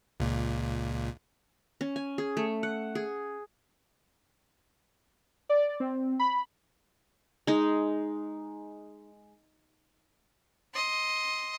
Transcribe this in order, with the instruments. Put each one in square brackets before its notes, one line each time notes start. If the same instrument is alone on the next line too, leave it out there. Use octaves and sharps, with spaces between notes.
[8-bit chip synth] C#2 A#2
[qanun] C#4
G#5
G#4
A3
F#5
G#4
[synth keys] D5
C4
B5
[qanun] G#3 D#4
[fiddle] D#5 C6